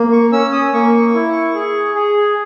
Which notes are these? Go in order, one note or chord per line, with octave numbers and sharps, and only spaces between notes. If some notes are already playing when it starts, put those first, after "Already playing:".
Already playing: A#3
C#6
C#4 E6
D#6
A#3 C#6
E4
G#4
G#4